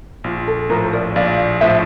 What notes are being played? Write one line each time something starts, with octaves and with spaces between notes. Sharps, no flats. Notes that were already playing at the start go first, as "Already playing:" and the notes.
A#1 F4
A4
A2 F3 A#4
A#4 D5
A#1 D5 F5
A2 F3 C5 E5